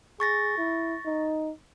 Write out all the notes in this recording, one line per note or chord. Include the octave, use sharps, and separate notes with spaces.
G#4 C#6 A6 A#6
E4
D#4